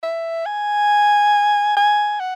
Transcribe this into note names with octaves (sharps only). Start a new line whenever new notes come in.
E5
G#5
G#5
F#5